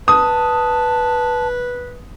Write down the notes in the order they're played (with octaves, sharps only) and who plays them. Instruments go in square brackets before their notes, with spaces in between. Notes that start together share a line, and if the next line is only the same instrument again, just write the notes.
[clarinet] B4 [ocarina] A5 [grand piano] D#6